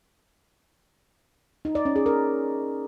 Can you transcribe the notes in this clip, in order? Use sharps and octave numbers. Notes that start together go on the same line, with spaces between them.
D#4
D5
C#4
G#4
A#4